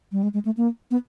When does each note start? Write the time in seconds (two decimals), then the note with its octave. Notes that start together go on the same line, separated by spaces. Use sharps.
0.12 G3
0.23 G#3
0.34 G#3
0.45 A3
0.57 A#3
0.91 B3